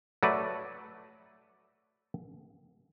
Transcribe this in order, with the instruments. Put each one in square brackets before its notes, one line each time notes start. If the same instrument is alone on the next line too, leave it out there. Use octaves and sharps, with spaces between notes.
[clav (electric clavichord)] F#3 A3 A4 B4 D5